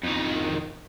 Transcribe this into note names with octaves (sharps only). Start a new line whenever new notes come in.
F2 D#3